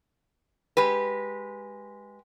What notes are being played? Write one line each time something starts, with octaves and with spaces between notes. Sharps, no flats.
G#3 G4 B4